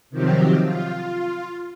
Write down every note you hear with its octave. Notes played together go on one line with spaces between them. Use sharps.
C3 D#3 F3 F#3 C4 G4
F4